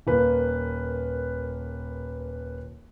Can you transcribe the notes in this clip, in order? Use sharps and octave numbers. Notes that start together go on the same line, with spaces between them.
D#1 A#3 B4